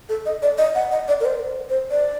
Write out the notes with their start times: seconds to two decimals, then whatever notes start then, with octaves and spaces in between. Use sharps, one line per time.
0.09 A4
0.26 D#5
0.42 D5
0.58 D#5
0.75 F#5
0.91 D#5
1.08 D5
1.20 A#4
1.25 C5
1.70 C5
1.91 D5